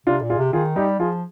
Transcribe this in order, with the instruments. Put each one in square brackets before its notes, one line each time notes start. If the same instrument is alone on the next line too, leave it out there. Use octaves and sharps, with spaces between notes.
[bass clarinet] C3 [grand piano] D4 F4
[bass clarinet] A#2
[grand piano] F4 G#4
[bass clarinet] C3
[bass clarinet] D#3 [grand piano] F4 G#4
[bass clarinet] G3 [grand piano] D#4 G4
[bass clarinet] F3 [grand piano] F4 G#4